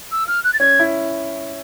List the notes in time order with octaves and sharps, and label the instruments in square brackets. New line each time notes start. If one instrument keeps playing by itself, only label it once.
[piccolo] E6
F6
F#6
A6
[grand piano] C#4 [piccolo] G#6
[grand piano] E4